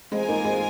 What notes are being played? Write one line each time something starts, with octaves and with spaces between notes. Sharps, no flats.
G#3 C4 F4 A#4 G#5
A#3 D#4
G#3 C4